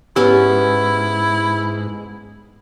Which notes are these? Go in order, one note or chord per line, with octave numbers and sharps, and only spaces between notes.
G#2 B3 C#4 E4 G4